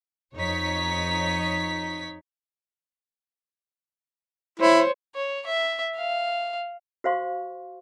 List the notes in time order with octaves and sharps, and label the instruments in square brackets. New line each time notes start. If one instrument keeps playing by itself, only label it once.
[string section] F2 D#4 C#5 B6
[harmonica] E4 [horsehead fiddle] C5 C#5
[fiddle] C#5
E5
F5
[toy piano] F#4 C5 F5 C6 C#6